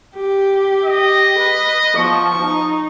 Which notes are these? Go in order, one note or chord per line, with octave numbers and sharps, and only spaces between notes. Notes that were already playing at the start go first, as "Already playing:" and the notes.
G4
D#5
B4
F3 B3 C#6
D#4